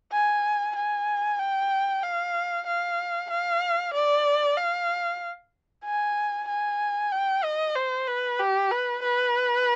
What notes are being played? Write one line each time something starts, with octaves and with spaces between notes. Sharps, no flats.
G#5
G#5
G5
F5
F5
F5
D5
F5
G#5
G#5
G5
D#5
C5
B4
G4
B4
B4